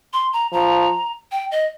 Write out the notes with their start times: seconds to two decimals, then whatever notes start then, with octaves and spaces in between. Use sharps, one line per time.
0.13 C6
0.33 A#5
0.53 F3 A#5
1.31 G5
1.51 D#5